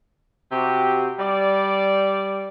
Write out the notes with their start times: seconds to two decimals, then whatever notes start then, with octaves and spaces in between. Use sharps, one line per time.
0.52 C3 F#4 G4
1.19 G3 D5